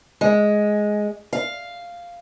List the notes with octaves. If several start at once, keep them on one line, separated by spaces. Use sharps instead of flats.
G#3
F5